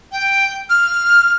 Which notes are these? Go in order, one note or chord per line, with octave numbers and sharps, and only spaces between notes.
G5
F6